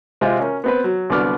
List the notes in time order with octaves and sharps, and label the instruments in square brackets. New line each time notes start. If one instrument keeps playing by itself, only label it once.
[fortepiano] C3 G#3 C4 F4
C#4 A#4
B3 C4 B4
F#3
C2 D3 F#3 B3 D5 F6